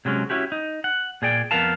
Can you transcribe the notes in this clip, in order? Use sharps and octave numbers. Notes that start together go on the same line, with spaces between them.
C3 F#3 G#3 C#4
C#4 E4 F#4 G4
D#4
F#5
A#2 G#4 D5 G5
F2 B3 A#4 F5 A5